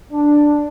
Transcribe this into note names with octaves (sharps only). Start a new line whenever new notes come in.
D4